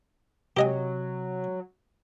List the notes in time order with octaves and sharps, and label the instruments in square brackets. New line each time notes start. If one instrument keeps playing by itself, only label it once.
[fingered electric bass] C3 [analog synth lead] F#3 [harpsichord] G4 D#5 G#5